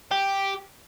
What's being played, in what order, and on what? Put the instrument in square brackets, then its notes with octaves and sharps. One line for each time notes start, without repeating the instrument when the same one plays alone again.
[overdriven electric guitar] G4